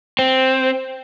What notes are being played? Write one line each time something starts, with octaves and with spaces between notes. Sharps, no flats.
C4